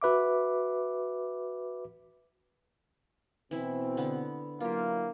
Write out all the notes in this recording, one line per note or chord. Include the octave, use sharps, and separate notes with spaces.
F#4 B4 E5 D6
B2 E3 C4 E4
D3 B3
F#3 A#3 E4 F4 G4